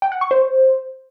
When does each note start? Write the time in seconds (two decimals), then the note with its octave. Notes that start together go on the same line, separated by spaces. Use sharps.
0.02 G5
0.12 F#5
0.21 C#6
0.31 C5